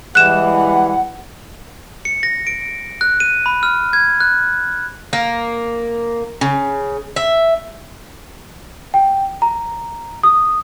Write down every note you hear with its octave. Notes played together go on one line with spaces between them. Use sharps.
E3 G3 G#3 F#5 F#6 E7
C#7
A#6
D7
F#6
D#7
B5
F6
G#6
F#6
A#3
C#3
E5
G5
A#5
D#6